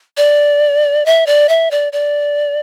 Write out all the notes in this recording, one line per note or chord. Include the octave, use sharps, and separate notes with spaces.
D5
E5
D5
E5
D5
D5